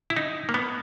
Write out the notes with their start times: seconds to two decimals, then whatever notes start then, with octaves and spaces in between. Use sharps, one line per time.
0.10 E4
0.17 D#4
0.49 A#3
0.54 B3